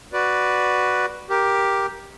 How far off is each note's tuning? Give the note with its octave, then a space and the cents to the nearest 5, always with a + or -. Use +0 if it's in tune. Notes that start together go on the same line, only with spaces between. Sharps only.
F#4 +0 B4 +0 D5 +0
G4 +0 A#4 +10